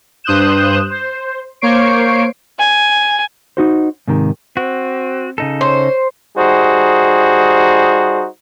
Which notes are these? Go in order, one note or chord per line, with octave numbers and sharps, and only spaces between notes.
G2 C5 D#6 F#6 G6 E7
C5
A#3 C5 C#5 C#6 C7 D7
G#5
D#4 F#4 C5
G#2 C3 D#3
C4 F#4
C#3 D#4 A4
C5 C#5
G3 D#4 F#4 G#4 C5